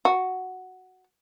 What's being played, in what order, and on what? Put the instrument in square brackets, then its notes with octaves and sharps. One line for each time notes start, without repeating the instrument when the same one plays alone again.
[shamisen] F#4